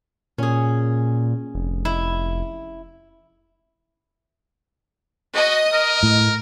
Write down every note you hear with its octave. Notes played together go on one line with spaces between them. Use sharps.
A#2 C#4 G#4
F1
E4
F#4 D#5
A#4
A2